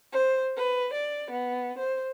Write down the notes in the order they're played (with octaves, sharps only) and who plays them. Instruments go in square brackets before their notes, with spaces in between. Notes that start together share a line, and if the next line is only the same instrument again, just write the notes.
[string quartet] C5
B4
D5
B3
C5